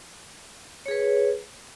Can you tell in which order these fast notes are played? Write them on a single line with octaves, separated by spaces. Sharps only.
C#5 G#4 B4